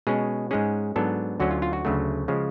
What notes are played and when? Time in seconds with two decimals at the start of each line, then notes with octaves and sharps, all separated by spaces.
0.07 B2 G#3 C#4 G#4
0.51 G#2 G#3 C#4 G#4
0.96 G#2 F#3 B3 D4 A4
1.40 D2 D3 F#3 C#4 F#4
1.51 F4
1.62 F4
1.73 F#4
1.85 D2 C#3 F#3 A3
2.28 C#3 F3 G#3